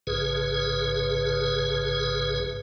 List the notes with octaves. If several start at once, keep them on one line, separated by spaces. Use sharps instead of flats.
A1 G#2 C#3 G#4 B4